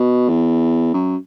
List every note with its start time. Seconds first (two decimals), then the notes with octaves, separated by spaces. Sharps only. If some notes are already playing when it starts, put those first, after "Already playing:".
Already playing: B2
0.29 E2
0.94 F#2